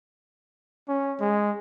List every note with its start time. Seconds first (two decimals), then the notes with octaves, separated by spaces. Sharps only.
0.88 C#4
1.20 G#3